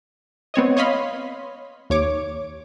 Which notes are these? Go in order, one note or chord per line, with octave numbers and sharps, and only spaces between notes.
B3 C4 C#5 D#5
C#5 D#5 F5 B5 C6
D#2 C#5 D6